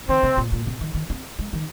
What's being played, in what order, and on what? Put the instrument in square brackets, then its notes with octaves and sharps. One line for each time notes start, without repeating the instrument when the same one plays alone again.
[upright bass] D#3 [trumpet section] C4
[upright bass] C3
A#2
A#2
C3
D#3
D#3
C4
G#3
D#3